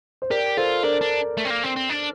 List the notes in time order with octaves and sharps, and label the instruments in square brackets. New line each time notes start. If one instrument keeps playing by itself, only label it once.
[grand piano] C5
[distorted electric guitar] G4 [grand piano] A#4 D5
[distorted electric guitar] F4 [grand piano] A4 C5
[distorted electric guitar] D4 [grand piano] A#4 D5
[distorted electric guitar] D4
A3
C4
A#3
C4
C4
D4